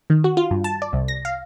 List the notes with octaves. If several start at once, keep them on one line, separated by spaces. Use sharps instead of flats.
D#3
F#4
F4
G2
A5
D5
C2
A#6
F5